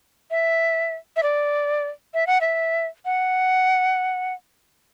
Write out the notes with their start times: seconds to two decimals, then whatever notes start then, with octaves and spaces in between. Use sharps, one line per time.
0.31 E5
1.16 E5
1.23 D5
2.14 E5
2.27 F#5
2.41 E5
3.05 F#5